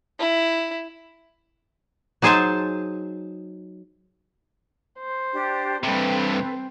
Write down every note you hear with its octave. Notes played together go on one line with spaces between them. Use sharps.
E4
F#3 D#4 G#4 C5 G#5 A5
C5
D4 G4
G2 C3 C4 A4 B4